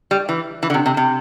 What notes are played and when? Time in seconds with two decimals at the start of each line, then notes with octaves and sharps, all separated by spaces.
0.11 G3
0.29 E3
0.63 E3
0.70 D3
0.74 C3
0.86 C3
0.97 C3